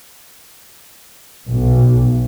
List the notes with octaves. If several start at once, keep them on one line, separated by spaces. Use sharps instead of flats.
B1